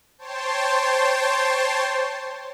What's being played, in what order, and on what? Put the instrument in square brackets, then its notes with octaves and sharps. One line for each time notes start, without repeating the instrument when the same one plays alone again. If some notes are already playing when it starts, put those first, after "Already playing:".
[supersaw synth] C5 C#5 G5 A5 C6